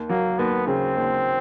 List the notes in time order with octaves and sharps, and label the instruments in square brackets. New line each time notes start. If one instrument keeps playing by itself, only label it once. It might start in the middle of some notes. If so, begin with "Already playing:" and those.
Already playing: [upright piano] D#2
[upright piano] F#3 [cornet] A#3
[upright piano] D#2 [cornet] B3
[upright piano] C#3 [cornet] C4
[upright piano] D#2